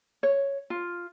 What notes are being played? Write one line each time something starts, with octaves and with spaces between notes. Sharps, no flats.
C#5
F4